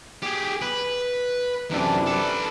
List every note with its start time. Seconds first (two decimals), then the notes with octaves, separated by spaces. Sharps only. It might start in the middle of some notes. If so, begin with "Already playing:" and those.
0.23 G4 G#4
0.62 B4
1.71 F#2 C3 E3 D4 A4
2.07 A4 B4